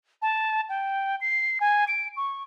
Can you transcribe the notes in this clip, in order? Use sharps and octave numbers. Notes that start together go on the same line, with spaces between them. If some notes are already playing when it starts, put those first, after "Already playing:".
A5
G5
C7
G#5
D7
C#6